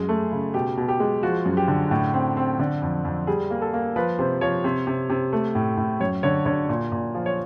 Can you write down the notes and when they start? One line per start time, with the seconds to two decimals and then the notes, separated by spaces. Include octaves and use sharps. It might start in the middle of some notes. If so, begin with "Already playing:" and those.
Already playing: F#2 G#3 G#4
0.09 A3
0.32 C#3
0.54 B2 G4
0.77 B2
0.88 G4
1.00 G#3
1.23 F3 F#4
1.46 F#2
1.57 G4
1.68 D3
1.91 A2
2.14 C4
2.37 C4
2.59 D3
2.82 F2
3.05 F2
3.27 G3 G#4
3.50 A#3
3.62 A4
3.74 A#3
3.96 F3 B4
4.19 C3 C5
4.41 F3 C#5
4.64 C3
4.87 C3
5.10 C3
5.33 A3
5.55 A2
5.77 A2
6.00 F#2 C#5
6.23 D3 C#5
6.46 D3 C#5
6.69 A#2
6.92 A#2
7.15 F3
7.26 C#5